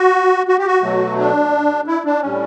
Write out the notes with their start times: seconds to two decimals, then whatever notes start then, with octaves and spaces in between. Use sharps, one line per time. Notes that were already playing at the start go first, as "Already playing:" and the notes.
Already playing: F#4
0.48 F#4
0.58 G4
0.67 F#4
0.83 B2 F#3 A3
1.19 D4
1.87 E4
2.05 D4
2.21 A2 G3 C#4